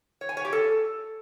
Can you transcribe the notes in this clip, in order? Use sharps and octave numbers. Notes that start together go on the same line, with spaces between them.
C#5
G#5
C#5
G4
A4